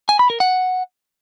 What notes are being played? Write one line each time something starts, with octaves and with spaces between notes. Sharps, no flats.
G#5
B5
A#4
F#5